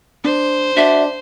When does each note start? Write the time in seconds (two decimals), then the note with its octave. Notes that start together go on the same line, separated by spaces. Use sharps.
0.24 D4 C5
0.77 D4 F#4 D5 E5